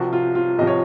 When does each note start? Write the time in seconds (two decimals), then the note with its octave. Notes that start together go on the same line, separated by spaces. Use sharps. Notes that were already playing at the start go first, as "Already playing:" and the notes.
Already playing: C2 C3 F3 F#4
0.13 F4
0.35 F4
0.58 C2 C3 F3 D#5
0.67 C#5